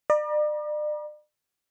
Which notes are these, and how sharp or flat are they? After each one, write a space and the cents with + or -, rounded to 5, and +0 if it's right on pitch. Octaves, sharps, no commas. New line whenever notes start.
D5 +40 A#5 +45